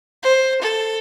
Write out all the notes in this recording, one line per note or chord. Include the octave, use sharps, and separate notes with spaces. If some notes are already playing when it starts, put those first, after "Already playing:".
C5
A4